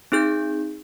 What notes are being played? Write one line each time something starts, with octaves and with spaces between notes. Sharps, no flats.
C4 D#4 G#4 G6